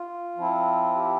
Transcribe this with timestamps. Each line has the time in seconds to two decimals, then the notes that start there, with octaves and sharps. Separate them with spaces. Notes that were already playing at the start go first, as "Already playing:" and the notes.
Already playing: F4
0.36 F3 C4 E4
0.96 G4